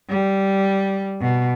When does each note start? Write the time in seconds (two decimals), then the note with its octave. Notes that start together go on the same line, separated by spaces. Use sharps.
0.10 G3
1.21 B2